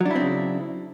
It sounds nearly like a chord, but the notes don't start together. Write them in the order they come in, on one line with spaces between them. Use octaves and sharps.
F#3 D4 E4 C4 C#3